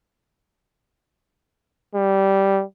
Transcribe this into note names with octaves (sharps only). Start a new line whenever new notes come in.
G3